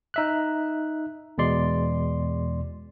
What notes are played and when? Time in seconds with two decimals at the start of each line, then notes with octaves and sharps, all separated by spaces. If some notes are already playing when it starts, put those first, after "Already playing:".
0.14 D#4 E5 F#6
1.38 E2 B2 G#3 D5 C6